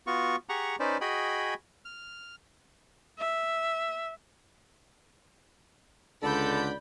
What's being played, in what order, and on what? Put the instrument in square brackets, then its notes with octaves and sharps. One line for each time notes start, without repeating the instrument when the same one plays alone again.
[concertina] B3 F4 F#4 C#6
G4 G#4 F#5 A#5 C#6
C#4 D#4 B4 C5 D5
F#4 G#4 D#5 G5 G#5 B5
F6
[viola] E5
[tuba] C#2 [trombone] D3 [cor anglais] A4 [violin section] D5 B5 G6